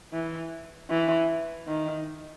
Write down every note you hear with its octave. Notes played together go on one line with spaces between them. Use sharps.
E3
E3
D#3